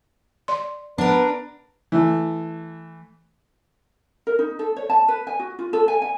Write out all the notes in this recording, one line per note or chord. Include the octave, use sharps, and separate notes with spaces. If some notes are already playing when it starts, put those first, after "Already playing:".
D5 C6
B3 D4 A#4 B4
E3 A3
A#4
D#4
A4
C#5
A5
B4
G#5
F#4
F4
A4
G#5
G#5